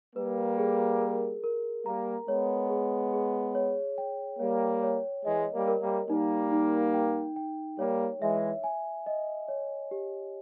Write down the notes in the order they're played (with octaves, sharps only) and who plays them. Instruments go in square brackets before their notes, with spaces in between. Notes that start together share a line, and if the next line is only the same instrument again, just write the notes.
[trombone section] G3 A#3 [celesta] B4
[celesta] G#4
A#4
A#4
[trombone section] G3 A#3 [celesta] A#5
[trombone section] G#3 B3 [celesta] C#5
[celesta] G#4
G#4
C#5
G5
[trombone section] G3 A#3 [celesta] C#5
[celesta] C#5
[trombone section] E3 G#3 [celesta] D#5
[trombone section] G3 A#3
[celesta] A#4
[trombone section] G3 A#3
[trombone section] G3 A#3 [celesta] D#4
[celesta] D#4
G5
G5
[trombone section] G3 A#3 [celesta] C#5
[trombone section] E3 G#3 [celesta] E5
[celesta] G#5
D#5
C#5
G4